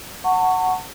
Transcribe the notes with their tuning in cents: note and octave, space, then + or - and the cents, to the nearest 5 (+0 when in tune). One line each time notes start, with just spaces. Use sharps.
F#5 +0 A5 +40 C#6 +0